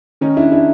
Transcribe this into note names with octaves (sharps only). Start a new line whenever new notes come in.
D#3 C#4 D#4
D4 E4
D4 E4